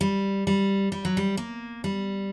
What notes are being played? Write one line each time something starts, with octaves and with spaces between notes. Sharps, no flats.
G3
G3
G3
F#3
G3
A#3
G3